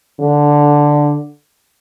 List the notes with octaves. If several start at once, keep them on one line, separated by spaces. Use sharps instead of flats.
D3